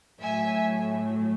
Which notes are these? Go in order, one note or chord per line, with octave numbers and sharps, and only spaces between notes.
A2 F#3 A3 E5 G#5